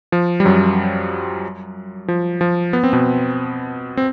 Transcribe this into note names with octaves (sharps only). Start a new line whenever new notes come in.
F3
G3
F#2 F#3
F3
F3
B3
C4
B2 B3
C4